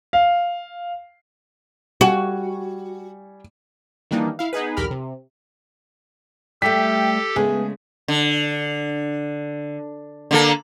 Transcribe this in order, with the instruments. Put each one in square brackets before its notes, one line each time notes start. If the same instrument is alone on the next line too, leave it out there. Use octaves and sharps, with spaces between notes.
[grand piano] F5
[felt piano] G3 G#5 [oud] F#4
[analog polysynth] D#3 E3 G3 A#3 D4 D#4
E4 F5
B3 D#4 G#4 B4
B1 E2 G4 A#4 B5 F6
C3
[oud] G3 A3 [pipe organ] G4 A4 [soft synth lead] G5 [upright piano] B6
[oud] C#3 G#3 A3 [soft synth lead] B3 [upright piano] G#4
[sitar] D3
D3 A#3 A4